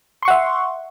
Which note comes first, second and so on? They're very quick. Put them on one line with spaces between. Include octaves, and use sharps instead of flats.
C6 C#6 F#5 E5